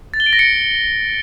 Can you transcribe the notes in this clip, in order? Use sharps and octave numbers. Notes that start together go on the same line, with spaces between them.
A6
G7
D7
A#6
C#7